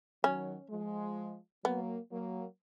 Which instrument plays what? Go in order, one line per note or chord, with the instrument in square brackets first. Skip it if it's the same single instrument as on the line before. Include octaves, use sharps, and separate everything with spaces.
[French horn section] D#3 F#3 [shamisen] C#4
[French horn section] F3 G#3
[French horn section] F#3 A#3 [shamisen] B3
[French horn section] F#3 A#3